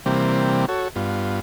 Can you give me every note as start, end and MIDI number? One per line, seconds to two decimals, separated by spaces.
0.06 0.66 48
0.06 0.66 52
0.06 0.66 55
0.06 0.66 58
0.06 0.66 60
0.69 0.88 66
0.69 0.88 69
0.69 0.88 73
0.96 1.40 43
0.96 1.40 59
0.96 1.40 65